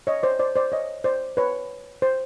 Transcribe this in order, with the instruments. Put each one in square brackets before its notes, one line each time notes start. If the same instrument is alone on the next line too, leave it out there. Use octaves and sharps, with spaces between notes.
[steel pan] C#5 D#5
C5 D5
C5 D5
C5 D5
C#5 D#5
C5 D5
B4 C#5
C5